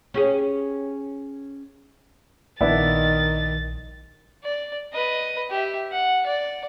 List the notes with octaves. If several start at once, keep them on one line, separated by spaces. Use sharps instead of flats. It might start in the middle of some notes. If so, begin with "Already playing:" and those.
C#4 G4 G#4
A#1 D#3 B3 D4 E4 A6
D5
B4 D#5
G4 E5
F#5
D5